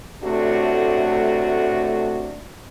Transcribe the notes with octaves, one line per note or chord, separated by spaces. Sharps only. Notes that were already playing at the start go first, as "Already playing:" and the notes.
A2 C3 A3 D4 F#4